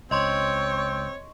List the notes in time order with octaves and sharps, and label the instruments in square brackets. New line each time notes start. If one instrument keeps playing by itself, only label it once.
[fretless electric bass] C#2 [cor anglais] C4 [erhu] C#5 [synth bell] D#5 C6 C#6